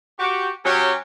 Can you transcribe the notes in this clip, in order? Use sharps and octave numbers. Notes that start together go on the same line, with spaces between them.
F#4 G4
F#3 C#4 G4